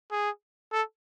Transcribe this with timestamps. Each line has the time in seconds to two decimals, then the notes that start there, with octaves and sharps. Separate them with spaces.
0.11 G#4
0.73 A4